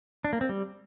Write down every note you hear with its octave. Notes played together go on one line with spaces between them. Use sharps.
D4
A#3
C4
G3